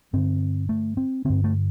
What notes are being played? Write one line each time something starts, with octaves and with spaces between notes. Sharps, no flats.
G2 D3 C4
A3
C4
G2 D3 C4
A3